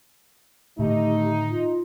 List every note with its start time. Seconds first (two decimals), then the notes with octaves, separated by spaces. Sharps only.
0.79 A2 D3 D#3 A3 D#4 G4
1.51 F4